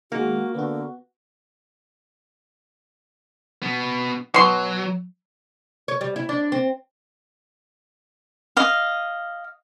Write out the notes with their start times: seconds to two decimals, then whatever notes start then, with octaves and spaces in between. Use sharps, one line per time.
0.12 D#3 G#3 A#3 F#4
0.54 D3 B3 F#4
3.62 B2 B3
4.34 B2 F#3 C6
5.88 C#5
6.01 G3
6.16 E4
6.29 D4
6.52 C4
8.57 D#5 F5